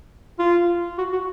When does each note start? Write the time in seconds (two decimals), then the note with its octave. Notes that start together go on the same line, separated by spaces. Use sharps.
0.39 F4
0.98 F#4
1.12 F#4